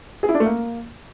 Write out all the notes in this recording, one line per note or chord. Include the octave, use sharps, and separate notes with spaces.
G#4
E4
D4
A3
A#3